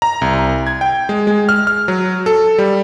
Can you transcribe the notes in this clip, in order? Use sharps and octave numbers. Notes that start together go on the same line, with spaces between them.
A#5
C2
G#6
G5
G#3
G#3
F6
F6
F#3
A4
G3